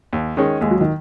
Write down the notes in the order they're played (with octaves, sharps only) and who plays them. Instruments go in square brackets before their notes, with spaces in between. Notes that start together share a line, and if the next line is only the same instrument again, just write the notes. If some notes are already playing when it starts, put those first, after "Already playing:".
[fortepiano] D#2
D#3 G#3 C#4
[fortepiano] D#2 [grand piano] G#3
[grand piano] F#3
D#3